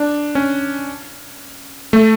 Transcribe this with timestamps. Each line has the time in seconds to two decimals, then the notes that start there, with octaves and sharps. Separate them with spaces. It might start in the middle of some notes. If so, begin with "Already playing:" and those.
Already playing: D4
0.35 C#4
1.93 A3